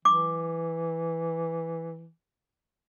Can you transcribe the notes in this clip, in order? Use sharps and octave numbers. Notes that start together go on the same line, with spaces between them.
E3 D6